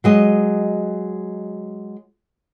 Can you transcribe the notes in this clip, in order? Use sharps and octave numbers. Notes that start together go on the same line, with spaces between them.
F#3 G#3 D#5